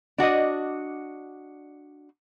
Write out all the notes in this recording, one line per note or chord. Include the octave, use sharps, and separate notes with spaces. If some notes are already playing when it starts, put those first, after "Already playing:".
D4 F#4 D5 D#5